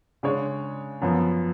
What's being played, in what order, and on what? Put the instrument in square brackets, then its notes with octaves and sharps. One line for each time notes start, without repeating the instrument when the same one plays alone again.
[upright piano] C#3 G#3 D4 G#4 C#5
F#2 F3 B3